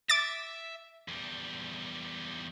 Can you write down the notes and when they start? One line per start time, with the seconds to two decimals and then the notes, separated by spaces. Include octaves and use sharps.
0.09 E5 D6 A6
1.08 E2 G3